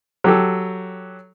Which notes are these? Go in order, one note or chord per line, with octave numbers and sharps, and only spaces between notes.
F#3 G4 A4